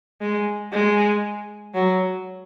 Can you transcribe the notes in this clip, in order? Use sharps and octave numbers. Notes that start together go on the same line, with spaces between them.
G#3
G#3
F#3